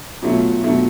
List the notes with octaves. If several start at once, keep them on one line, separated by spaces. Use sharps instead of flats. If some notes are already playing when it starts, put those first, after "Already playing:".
B2 F#3 A3 F4
B2 F#3 A3